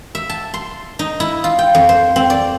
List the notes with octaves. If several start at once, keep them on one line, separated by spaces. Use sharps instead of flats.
E5
A5
C6
D#4
E4
F4
G5
F2
C5
C4
D5